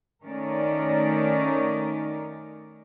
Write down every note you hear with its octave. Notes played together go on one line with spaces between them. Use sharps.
D#3 A3 C#4 D#4 A#4 D5